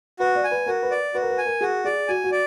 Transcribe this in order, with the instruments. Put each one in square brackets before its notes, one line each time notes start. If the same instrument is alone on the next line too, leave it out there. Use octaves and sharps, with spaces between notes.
[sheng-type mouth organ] F#4 [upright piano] B4
[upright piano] D5
[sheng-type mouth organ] G#5
[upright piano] B4
[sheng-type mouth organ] F#4 [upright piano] A#4
[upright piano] B4
[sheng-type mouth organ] D5
[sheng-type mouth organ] F#4 [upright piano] B4
[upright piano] A#4
B4
[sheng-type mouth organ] G#5
[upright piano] A#4
[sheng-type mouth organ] F#4 [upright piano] G#4
[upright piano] G#4 [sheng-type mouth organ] D5
[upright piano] F#4 [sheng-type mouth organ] G#5
[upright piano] F#4
[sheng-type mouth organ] D5